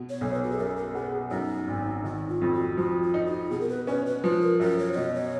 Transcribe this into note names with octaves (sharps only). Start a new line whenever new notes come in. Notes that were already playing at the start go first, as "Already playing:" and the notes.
Already playing: B2
C#5
B1
B4
F#4
G#4
F#2 A#4
A#4
B3 G#4
F#2 D#4
G#1
D#3 D#4
F4
F2
F#4
F3 F#4
F4
D#4
F#4
B2 G#4
A#4
B4
C#4 B4
B4
F3 B4
A#4
F#2 A#4
C#5
C#5
B2 D#5
C#5